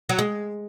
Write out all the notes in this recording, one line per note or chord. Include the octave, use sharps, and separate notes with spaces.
F#3
G#3